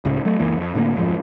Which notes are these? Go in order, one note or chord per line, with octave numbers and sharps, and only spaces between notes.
C#2 A2 C#3
F#3 A3
F#1 C#2 E3 A#3
F2
A2 D3 A3 A#3
D1 F2 G#2 F3